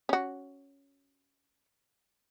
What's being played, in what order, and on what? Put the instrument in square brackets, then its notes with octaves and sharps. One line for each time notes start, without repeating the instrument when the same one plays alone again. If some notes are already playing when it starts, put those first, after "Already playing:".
[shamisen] C#4 F#4